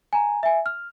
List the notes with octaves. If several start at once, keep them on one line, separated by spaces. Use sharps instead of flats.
G#5 A#5
E5 G#5
F6